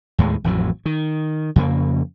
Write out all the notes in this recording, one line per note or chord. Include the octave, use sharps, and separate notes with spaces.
D#2 A2 G#3
A1 F2 A2 F#3
D#3
F2 C#3 A#3